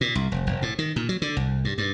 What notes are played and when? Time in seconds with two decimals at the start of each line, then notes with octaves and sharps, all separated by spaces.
0.01 A#2
0.15 C2
0.32 F1
0.47 F1
0.62 A2
0.79 D#3
0.96 A#2
1.09 F#3
1.22 D3
1.37 C2
1.65 G2
1.78 G2